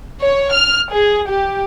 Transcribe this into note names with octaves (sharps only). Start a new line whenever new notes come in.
C#5
F6
G#4
G4